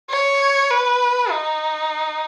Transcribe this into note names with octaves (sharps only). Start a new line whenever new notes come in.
C#5
B4
D#4